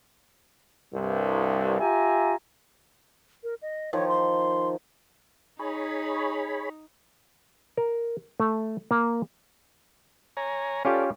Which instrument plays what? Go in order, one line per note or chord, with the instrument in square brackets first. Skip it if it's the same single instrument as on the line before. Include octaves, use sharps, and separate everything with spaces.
[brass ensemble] C2 G2
F4 G4 E5 G#5 A#5
[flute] A#4
D#5
[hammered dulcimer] D#3 F3 [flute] C#5
[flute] C6
[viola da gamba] D#4 [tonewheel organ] G#4 C#5 B5
[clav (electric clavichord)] A#4
A3
A#3
[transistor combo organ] C#5 G#5 A#5
[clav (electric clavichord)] C#4 F4 G4 [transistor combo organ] A4 D5